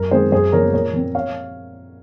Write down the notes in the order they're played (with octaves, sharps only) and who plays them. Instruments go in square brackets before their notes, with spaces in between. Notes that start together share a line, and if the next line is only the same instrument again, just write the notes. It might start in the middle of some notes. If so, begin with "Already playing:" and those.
Already playing: [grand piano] F#2 A#4
D#3 G#3 C4 G#4 C5
F#2 G#4 C5
C#3 F3 A#3 C#4 A#4 C#5
A#2 A#4 C#5
F3 C4
C#5 F5